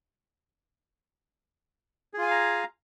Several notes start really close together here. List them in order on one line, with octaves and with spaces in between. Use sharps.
G#4 F4 G#5 F5 A#5